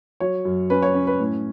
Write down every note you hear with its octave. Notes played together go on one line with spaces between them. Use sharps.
F#3 C#5
F#2
C#4 B4
C#5
C#4
B4
A2